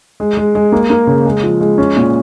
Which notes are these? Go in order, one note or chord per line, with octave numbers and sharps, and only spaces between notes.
G#3
G#3
G#3
A#3
A#3
C#3
G#3
F3
G#3
C#4
A#2